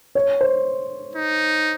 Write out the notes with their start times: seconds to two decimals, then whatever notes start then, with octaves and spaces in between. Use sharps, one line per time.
0.15 C#5
0.41 C5
1.15 D#4